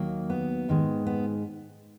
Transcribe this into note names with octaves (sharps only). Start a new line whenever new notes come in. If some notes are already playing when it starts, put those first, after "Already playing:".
Already playing: D#2 D#3 F#3 A#3
B3
G#2 D#3 G#3
B3